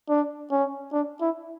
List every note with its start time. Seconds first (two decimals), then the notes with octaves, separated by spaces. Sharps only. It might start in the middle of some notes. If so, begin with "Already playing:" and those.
0.09 D4
0.51 C#4
0.93 D4
1.21 E4